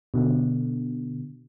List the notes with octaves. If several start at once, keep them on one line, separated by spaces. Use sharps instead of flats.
B2 D3